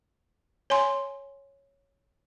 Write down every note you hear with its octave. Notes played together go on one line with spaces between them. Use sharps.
C#5 G#5 C6